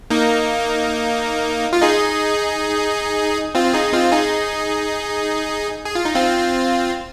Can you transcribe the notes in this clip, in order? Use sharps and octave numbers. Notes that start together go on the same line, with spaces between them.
A#3 D#4
F4
D#4 G#4
C4 F4
D#4 G#4
C4 F4
D#4 G#4
G#4
F4
D#4
C4 F4